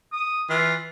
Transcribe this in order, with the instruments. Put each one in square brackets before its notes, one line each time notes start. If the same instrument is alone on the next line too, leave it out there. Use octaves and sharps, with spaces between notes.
[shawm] D#6
[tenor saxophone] E3 [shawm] F4